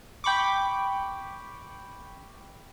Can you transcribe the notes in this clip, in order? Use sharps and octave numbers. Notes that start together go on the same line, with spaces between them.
G5 B5 C#6 D6